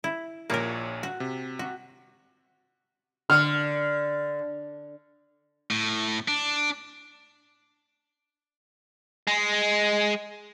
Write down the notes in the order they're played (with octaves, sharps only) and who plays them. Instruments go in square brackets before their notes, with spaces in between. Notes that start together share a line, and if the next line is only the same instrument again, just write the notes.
[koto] E4
[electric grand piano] A#1 A#2 C#5 [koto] A#3 A#4
[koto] F#4
[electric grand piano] C3
[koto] F#4
[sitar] D3 [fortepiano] F6
[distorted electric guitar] A2
D4
[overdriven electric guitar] G#3